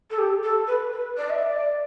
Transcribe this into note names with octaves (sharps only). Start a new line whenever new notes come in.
A4
G4
A4
B4
B4
D5
E5
D5